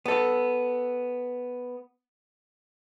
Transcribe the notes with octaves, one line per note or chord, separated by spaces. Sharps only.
B3 A4